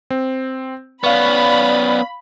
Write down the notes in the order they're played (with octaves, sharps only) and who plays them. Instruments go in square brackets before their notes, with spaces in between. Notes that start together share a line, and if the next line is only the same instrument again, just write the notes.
[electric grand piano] C4
[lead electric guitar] B3 C#4 [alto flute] D5 [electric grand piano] F5 C#6 [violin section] B5